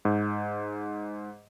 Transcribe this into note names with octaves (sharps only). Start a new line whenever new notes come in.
G#2